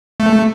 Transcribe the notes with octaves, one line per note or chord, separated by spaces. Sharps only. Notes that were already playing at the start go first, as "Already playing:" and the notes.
A3